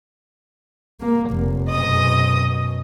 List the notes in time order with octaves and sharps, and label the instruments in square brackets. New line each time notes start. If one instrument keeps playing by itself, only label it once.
[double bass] A#3
F1
[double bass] F#2 B2 [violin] D#5 D#6